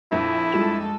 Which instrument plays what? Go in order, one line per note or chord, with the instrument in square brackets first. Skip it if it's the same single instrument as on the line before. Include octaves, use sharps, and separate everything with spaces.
[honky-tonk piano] A#1 F2 [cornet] E4
[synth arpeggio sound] G3 F4 E7 [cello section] G#3 A4